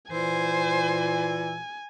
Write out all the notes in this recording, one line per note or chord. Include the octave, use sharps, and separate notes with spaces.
A#2 E3 C5 G#5